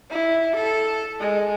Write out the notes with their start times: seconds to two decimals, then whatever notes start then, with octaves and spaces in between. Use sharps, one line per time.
0.10 E4
0.56 A4
1.20 G#3